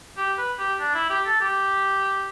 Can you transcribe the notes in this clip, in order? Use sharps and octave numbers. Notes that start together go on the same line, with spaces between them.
G4
B4
G4
D4
E4
G4
A4
G4